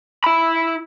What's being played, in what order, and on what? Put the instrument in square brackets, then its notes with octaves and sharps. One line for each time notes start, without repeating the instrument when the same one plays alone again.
[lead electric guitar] E4 B5